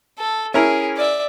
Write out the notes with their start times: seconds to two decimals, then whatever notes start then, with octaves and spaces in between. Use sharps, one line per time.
0.19 A4
0.54 C#4 E4 G#4 A#4
0.97 D5 E5